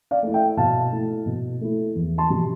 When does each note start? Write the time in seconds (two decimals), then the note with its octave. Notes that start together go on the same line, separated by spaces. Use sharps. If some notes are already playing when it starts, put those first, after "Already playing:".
0.11 D5 F5
0.23 A3 E4
0.34 E5 G5
0.57 B2 F5 A5
0.92 A3 E4
1.26 B2
1.61 A3 E4
1.95 E2
2.18 A5 C6
2.30 B2 G3